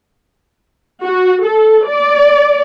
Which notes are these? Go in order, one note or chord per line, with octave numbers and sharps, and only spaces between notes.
F#4
A4
D5